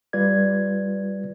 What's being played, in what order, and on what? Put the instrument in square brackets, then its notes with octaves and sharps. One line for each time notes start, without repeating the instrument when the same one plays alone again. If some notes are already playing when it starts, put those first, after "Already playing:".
[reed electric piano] G3 F4 B4 D5 G#6